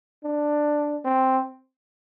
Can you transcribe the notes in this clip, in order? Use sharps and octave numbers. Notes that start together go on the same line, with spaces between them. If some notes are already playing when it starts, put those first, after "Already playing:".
D4
C4